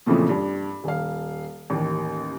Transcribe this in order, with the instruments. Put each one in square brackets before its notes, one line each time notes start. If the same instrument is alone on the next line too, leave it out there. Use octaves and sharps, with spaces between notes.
[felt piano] F2 A#2 C#3 E3 F3 A3
G2
D#1 F5
A1 D#2